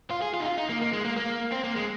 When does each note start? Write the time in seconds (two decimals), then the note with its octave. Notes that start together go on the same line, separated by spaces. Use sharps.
0.10 F4
0.22 G#4
0.34 F4
0.40 D#4
0.46 F4
0.58 D#4
0.69 A#3
0.82 A#3
0.93 G#3
1.05 A#3
1.17 A#3
1.52 C4
1.64 A#3
1.76 G#3